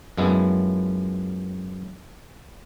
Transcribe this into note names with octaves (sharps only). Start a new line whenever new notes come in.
F#2 F3 G#3 B3 E4